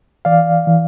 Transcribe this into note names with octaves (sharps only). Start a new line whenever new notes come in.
E3 D5 F5
E3